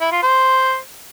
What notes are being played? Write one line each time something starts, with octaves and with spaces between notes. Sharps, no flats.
E4
F4
C5